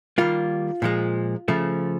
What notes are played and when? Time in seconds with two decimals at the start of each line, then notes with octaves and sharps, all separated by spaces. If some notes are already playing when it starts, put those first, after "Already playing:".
0.18 D#3 G3 A#3 F4
0.82 A#2 F3 G#3
1.48 C#3 F3 A3